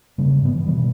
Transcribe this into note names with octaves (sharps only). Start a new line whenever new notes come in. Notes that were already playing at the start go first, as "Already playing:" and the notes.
C#3 G3 A#3
G#2 F3 A3 B3
E3
B2 D#3 E3 G3